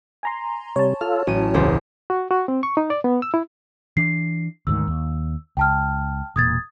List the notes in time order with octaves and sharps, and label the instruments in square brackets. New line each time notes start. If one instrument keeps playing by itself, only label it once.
[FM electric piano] G#5 A#5 C6
[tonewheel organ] C3 G3 [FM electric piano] C#5 A5
[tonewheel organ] F4 A4 [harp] F6
[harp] A1 D#7 [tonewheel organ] F#3 C#4
[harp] E1 C#2 C5
[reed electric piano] F#4
F#4
C4
C#6
D#4
D5
B3
E6
E4
[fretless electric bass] E3 D4 [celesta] C7
[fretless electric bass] D2 G#2 D#3 [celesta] E6
[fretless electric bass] D#2
[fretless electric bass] C#2 [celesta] G5 A5 F6
[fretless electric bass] E1 A#2 [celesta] D#6 G#6 A6